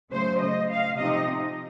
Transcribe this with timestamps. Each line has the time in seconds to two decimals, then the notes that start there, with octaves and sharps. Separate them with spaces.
0.13 C#3 F#3 A3 C5
0.40 D#5
0.70 F5
0.98 C3 F3 C4 D#4 D#5